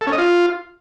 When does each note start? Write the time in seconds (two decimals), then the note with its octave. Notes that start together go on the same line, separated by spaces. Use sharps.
0.01 A4
0.07 C#4
0.12 D#5
0.18 F4